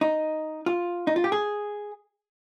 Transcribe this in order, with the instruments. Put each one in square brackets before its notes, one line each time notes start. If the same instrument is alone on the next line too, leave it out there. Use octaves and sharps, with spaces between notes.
[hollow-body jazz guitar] D#4
F4
D#4
F4
G4
G#4